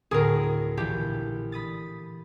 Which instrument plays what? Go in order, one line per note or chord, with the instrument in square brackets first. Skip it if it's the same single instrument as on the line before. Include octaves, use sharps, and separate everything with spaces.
[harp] D2 A2 D7 [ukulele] G#4 A#4
[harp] A#1 E3 [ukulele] G4
[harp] B5 D#6 A6